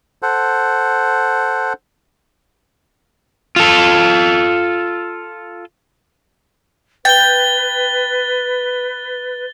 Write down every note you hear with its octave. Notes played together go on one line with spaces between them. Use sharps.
A4 C5 F#5
F4 A4
B4 G5 A6 G7